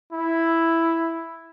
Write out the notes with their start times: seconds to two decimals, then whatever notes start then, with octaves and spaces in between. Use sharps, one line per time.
0.12 E4